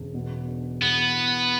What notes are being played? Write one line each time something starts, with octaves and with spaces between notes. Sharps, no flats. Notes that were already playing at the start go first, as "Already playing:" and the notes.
Already playing: E1 C#3
B2
D4
E2 B3
E2